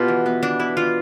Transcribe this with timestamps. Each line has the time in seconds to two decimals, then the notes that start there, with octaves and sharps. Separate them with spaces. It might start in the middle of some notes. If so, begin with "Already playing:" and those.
Already playing: B2 B3 F4 G4
0.08 E3
0.26 B3
0.43 E3 D4
0.60 B3 E4
0.77 E3 F4